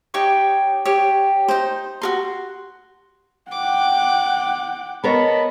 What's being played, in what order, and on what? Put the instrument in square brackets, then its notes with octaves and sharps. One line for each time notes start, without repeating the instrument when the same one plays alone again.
[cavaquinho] D#4 G4 C#5 C#6
G4 C#5
D#4 C5
F#4 A#4 C6
[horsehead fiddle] F#5 G5 [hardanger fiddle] D6
[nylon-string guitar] B3 A#4 C#5 [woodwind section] D#5 A5 B5